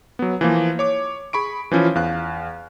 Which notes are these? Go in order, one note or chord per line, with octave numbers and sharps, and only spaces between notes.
F#3 B3
E3 F3 A#3
C#5 D6
G#4 B5 C#6 D7
E3 F3 C#4 E4 F4
E2 F5 F#6